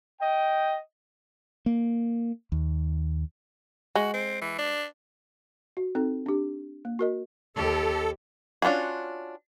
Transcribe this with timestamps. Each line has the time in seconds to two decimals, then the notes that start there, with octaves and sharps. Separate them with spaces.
0.21 D#5 G5
1.66 A#3
2.52 D#2
3.95 G#3 F#4
4.13 C4
4.41 E3
4.58 D4
5.77 F#4
5.95 C4 D#4 A4
6.26 D4 G4
6.85 A#3
6.99 F#4 A#4 D#5
7.56 D#2 G4 A4
8.62 C#4 D4 F4 F#4 G#4